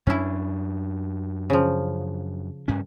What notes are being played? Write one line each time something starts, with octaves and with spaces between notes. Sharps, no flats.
F#2 C#4 D4 E4
C#3 F3
G2 C#4